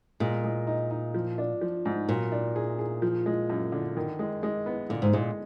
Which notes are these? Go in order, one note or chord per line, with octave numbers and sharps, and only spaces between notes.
A#2 G#3
G#3
D#4
D#4
F3
D4
F3
G#2
A#2 F#3
D4
G#4
G#4
F3
G#3
F#2
D3
D#3
G#3
G#3
B3
A#2 D3
G#2
A#2 G#3